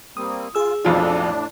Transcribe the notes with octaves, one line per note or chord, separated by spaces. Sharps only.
G3 A#3 C4 D#6
F4 G#4 E6
B1 F2 A2 D4 F4